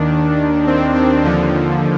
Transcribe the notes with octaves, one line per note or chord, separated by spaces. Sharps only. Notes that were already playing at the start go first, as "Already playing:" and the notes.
Already playing: D#2 D#3 D4
C4
C4
D#2 D3 F3